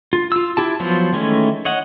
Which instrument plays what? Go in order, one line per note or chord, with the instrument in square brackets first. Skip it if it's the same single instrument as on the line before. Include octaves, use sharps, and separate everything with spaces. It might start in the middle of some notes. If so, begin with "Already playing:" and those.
[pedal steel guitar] F4
F4 E6
E4 G4 A5
F3 F#3 B3 F4 C5
D#3 E3 G#3 A3 C#4
C#5 D#5 F#5